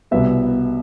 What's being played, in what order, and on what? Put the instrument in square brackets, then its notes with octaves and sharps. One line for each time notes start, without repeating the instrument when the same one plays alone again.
[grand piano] C2 B2 G3 B3 E5